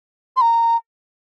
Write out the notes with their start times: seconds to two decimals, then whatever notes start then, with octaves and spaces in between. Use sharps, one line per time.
0.37 C6
0.41 A#5